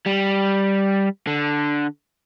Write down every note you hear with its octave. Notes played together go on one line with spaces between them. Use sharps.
G3
D3